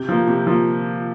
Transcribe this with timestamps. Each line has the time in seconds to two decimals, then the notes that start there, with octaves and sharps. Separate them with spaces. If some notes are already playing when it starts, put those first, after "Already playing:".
Already playing: C3 G6
0.09 F3 A#3
0.27 C3
0.47 F3 A#3